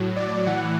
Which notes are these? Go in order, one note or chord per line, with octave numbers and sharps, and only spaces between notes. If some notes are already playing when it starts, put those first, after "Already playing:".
Already playing: A2 F#3
D5
A2 E3 F#5